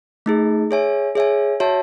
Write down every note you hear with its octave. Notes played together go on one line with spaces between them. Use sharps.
A3 D#4 G#4
G#4 C#5 E5 G#5
G#4 C#5 E5 G#5
F#4 C#5 E5 A5